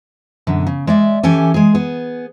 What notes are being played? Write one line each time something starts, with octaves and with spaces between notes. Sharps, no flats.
F#2 B2 D3
C#3
G#3 D5 E5
E3 C#4 G4 A4 G#5
G#3 G#4
B3 G#4